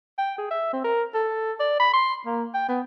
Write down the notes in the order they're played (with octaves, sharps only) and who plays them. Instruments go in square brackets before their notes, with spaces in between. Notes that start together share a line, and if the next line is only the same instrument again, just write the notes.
[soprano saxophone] G5
G#4
E5
C4
A#4
A4
D5
B5
C6
A#3
G5
B3